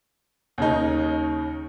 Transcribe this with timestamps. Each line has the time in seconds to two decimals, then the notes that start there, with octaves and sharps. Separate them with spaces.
0.58 D#2 C#3 D#4